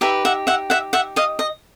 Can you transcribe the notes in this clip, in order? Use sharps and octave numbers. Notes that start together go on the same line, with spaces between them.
D#4 G4 B4 E5
E5 F#5
E5 F#5
E5 F#5
E5 F#5
D#5 F5
D#5